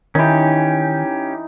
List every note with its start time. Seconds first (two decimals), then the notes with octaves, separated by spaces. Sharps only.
0.15 D#3 E3 C#4 D#4 G4